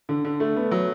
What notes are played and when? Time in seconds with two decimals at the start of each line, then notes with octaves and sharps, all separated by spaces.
0.09 D3
0.25 D3
0.40 A3
0.56 B3
0.71 F#3